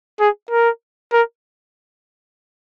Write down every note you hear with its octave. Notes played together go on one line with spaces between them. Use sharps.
G#4
A#4
A#4